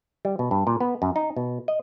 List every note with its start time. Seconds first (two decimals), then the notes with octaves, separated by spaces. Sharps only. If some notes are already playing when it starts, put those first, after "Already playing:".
0.25 G3
0.39 B2
0.51 G2
0.67 A#2
0.81 B3
1.02 F#2
1.16 D#4
1.36 B2
1.68 D#5